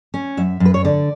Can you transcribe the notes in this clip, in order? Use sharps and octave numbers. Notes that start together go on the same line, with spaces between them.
C#4
F#2 E5
F#2
B4
C#5
D3 D5